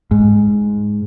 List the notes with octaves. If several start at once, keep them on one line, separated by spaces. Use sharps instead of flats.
G#2